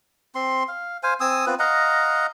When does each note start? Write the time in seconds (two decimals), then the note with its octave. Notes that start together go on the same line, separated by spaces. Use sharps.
0.35 C4 C6
0.68 F5
1.03 C5 F5 G#5
1.20 C4 G#5 D#6 E6
1.46 B3 C4 F4 B4
1.59 D#5 F5 F#5 A#5